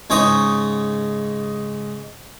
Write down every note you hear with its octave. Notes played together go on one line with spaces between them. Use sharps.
G#2 C#3 D#4 C#5 D#5